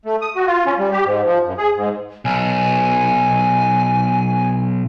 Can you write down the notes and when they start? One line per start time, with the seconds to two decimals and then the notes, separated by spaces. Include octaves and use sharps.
0.05 A3
0.21 D#6
0.35 F#4
0.47 F4
0.66 C#4
0.79 G3
0.91 G4
1.05 G#2
1.25 F3
1.46 F#2
1.58 G#4
1.76 G#2
2.25 B1 G#5